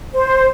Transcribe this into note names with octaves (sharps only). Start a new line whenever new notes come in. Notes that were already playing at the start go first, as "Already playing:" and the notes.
C5